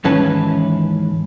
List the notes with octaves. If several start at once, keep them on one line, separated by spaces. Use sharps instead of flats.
D#2 G#2 E3 C#4 B4 A5